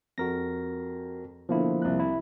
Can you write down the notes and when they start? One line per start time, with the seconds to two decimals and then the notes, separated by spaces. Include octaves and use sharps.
0.18 F2 F#4 A#4 A#6
1.49 B2 D3 F3 A#3 E4
1.82 C2 F#6
1.99 E4